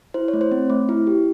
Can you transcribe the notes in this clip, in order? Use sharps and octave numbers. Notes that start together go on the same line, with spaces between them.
E4 C5
C#5
A3
C5
C4
A3
E4
G4